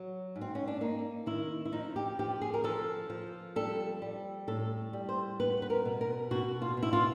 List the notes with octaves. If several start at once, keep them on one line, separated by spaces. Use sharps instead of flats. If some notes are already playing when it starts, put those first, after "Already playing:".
Already playing: F#3
G#2
C4
C#4
D4
A#3 D#4
D#3 E4
E4
F3 D#4
G4
F3 G4
G#4
A#4
F3 A4
F3
G3 A4
G3
A2 A4
G3
C5
B3 B4
B4
A#4
B2
A#4
B2 F#4
F4
B2
E4
F4